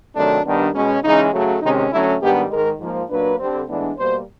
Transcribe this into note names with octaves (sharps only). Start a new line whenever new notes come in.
C3 D#3 F#3 A3 D4
G2 D#3 G3 B3 D4
B2 G#3 C#4
C#3 E3 G#3 C#4 D#4
C#3 F#3 A3
C3 D#3 G#3 C#4 D#4
D3 F#3 A3 C#4 E4
G#2 D#3 G3 B3 D4 G4
G#2 D#3 G#3 A#4
G#2 F3 A#3
A#2 F#3 A#3 D4 B4
D3 G3 C4
A2 E3 G#3 B3 D4
B2 G3 A#3 C5